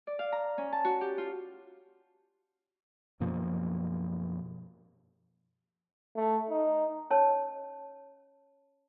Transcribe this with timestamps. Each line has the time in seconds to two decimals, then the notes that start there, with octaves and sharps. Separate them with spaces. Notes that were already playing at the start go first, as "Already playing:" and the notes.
0.07 D5
0.19 F5
0.32 A#5
0.58 C#4
0.73 A5
0.85 F#4
1.01 G4
1.18 F4
3.20 F#2 B2 F3 A#3
6.16 A3
6.50 D#4
7.10 C#4 C#5 A5